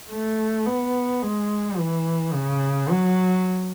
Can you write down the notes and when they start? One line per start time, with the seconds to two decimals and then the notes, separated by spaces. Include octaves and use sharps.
0.10 A3
0.66 B3
1.22 G#3
1.78 E3
2.34 C#3
2.89 F#3